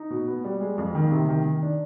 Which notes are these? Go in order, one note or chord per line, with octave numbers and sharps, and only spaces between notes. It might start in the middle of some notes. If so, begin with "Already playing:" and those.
Already playing: D#4
B2
B3
G3
G#3
F2
D#3
C3
D#3
D#3
D4